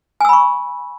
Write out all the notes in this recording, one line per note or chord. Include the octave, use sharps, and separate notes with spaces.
G#5 B5 C#6 E6